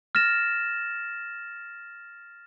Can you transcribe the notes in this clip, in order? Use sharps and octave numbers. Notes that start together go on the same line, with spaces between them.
F6 A6 A#6 E7